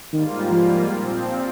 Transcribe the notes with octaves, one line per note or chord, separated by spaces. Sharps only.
G#2 D#3 G3 A#3 F4
F3
A#2 F3 C4